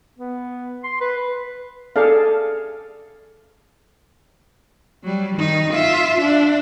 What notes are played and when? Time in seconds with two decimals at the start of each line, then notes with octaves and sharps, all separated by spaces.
0.19 B3
0.84 C6
1.01 B4
1.96 G#4 A4 D5 F5
5.03 F#3 G3
5.35 D#3 D#4
5.72 F4 E5
6.21 D4